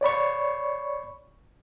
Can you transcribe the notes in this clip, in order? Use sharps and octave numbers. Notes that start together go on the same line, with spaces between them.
C#5 D5 B5 C#6